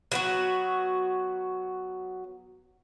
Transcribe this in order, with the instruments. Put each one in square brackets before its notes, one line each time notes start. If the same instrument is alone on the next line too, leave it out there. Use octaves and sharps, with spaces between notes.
[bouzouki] F#3 B3 F#4